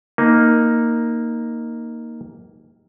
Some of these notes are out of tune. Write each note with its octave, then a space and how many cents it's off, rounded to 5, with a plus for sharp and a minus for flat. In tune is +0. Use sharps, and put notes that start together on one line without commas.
A#3 +0 D#4 +0